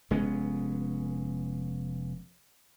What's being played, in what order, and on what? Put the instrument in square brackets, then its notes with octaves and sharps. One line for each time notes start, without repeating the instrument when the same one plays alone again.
[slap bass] F1 G#3 B3 C#4